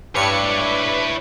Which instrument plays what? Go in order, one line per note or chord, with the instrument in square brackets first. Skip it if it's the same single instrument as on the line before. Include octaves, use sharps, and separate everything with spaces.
[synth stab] G2 C#7 [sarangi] D4 [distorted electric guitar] E4 C#5 [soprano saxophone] B4